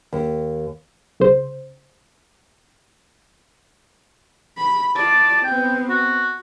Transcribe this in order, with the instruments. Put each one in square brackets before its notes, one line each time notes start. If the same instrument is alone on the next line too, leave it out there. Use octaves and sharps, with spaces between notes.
[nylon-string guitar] D#2
[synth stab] C2 C#3 C5
[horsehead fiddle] B5
[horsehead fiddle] F4 D5 [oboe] A5
[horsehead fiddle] B3 C4 [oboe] G5
[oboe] F#4